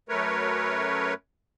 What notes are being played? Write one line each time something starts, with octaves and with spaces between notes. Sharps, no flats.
F#2 A3 A#4 B4 C#5